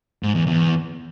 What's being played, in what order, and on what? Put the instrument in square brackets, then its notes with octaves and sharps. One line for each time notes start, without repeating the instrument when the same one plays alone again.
[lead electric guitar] G#2
E2
E2